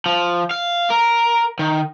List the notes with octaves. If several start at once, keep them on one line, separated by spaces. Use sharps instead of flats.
F3
F5
A#4
D#3